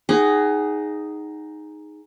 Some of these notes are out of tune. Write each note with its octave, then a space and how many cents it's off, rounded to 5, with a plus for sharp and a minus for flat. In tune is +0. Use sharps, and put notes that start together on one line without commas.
D#4 +0 G#4 +0 F#5 +30